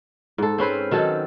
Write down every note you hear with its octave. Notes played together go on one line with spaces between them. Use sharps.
G#2 A4
C4 C#4 B4 C5
D#3 F#3 A4